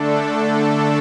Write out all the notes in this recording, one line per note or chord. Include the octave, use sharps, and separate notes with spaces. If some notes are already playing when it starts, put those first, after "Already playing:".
Already playing: D3 A3 D4 A4